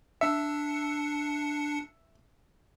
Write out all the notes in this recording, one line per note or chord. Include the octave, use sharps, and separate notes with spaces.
D4 E5 C#7